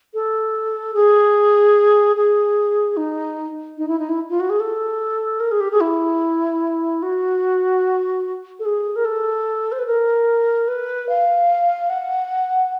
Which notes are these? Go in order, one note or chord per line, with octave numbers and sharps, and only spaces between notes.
A4
G#4
G#4
D#4
D#4
E4
D#4
E4
F4
F#4
G#4
A4
A#4
G#4
G4
G#4
E4
F#4
A4
G#4
A#4
A4
C5
B4
A#4
B4
F5
F#5